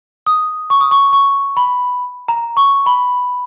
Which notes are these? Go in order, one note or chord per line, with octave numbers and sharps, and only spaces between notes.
D#6
C#6
D#6
C#6
C#6
B5
A#5
C#6
B5